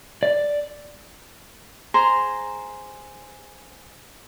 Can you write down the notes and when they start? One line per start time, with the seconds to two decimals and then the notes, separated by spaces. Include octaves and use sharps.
0.23 D5
1.94 G#4 C5 A#5